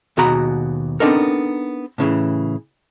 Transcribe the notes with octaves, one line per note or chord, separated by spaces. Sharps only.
D#2 B2 F#4 G#4 A#5 B5
B3 C4 D4 D#4 A4 A#4
A2 C#3 E3